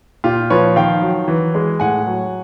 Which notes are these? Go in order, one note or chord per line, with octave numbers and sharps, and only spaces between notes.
A#2 F4 G4
F3 B4 C#5
D#3 F5 G5
F#3
E3
G#3
A2 F#5 G#5
F#3